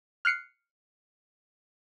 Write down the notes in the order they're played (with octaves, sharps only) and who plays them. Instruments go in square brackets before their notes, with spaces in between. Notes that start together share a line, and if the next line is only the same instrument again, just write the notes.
[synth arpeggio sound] F6 F#6 C7 C#7